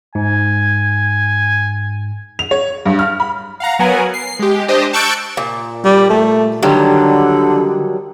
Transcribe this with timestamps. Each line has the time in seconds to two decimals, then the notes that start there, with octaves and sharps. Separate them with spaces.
0.15 G#2 G#5
2.39 F7
2.51 C#5
2.86 G2
2.99 F6
3.20 B5
3.60 F5 F#5 A#5
3.79 F#3 B3 A#4 F#5 G#5
4.14 C7
4.39 G#3 G4
4.68 D4 G4 C5 D#5
4.93 A5 C#6 E6 F#6 G6 D7
5.37 A#2
5.85 G3
6.10 A3
6.63 D3 D#3 F#3 G3